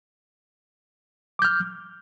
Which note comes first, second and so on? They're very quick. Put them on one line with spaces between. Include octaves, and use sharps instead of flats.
D6 G6 F6